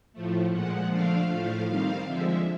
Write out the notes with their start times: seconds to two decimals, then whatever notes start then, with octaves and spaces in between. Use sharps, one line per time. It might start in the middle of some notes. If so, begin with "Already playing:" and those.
0.13 A2 F3 A3
0.52 A#2 F3 G#3 F#5
0.90 D3 F3 A3 D4 F5
1.28 A2 F3 A3 F5
1.67 D#3 G3 C4 F5
2.06 D3 F3 G#3 E5